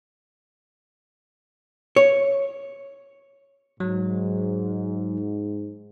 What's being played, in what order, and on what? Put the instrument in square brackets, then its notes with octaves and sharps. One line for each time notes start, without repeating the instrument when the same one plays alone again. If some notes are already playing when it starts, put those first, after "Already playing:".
[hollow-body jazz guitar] C#5
[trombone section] G#2 [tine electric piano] F#3